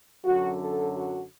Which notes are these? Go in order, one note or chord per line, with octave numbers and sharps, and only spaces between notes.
F#2 D3 F#3 F#4
A4
F#4